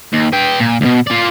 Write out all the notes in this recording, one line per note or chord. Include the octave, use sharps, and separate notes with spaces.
D#2
B4 G5
A#2
D2 B2
F4 D5